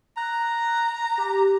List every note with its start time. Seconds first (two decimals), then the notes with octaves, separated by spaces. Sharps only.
0.17 A#5 F#6
1.18 G4